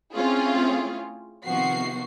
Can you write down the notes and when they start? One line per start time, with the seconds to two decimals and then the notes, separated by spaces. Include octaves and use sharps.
0.14 A3 C4 C#4 E4 F4 G#4
1.45 C3 D#3 F3 B3 F#4 C7